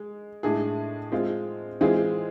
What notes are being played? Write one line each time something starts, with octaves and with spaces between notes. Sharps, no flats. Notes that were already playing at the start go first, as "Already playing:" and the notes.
Already playing: G#3
A2 G#3 D4 G#4
G#3 C4 F4
E3 G#3 C4 F4 G#4